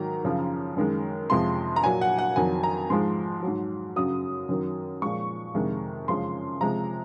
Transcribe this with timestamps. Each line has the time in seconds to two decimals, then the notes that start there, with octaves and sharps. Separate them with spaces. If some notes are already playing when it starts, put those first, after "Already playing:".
Already playing: G#2 D#3 F#3 A#5
0.24 F#2 C#3 F3
0.77 F#2 D#3 G#3
1.30 F2 C3 F3 G#3 C6
1.76 A#5
1.83 A#2 F#3 G#5
2.01 F#5
2.19 F#5
2.36 F2 D#3 F#3 G#5
2.63 A#5
2.90 G#2 F3 G#3 C6
3.43 G#2 F#3
3.96 F#2 C#3 F#3 D#6
4.49 F#2 D#3 F#3
5.02 A#2 F3 G#3 C#6
5.55 F2 C3 D#3 G#3
6.08 F#2 C#3 F3 G#3 C6
6.61 C3 F3 G#3 A#5